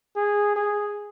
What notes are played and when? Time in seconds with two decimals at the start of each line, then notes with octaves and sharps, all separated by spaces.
0.16 G#4
0.56 G#4